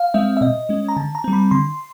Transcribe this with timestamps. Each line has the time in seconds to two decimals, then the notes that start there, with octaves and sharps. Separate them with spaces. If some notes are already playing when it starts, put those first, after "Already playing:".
Already playing: F5
0.14 G#3 C4 E5
0.37 E5
0.41 B2 D#5
0.69 G#3 C#4
0.88 A#5
0.97 D3 A5
1.15 A#5
1.24 G3 C4
1.33 B5
1.51 D3 C6